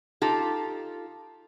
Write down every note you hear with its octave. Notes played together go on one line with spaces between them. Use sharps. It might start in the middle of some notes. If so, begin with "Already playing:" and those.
D#4 F4 G4 A4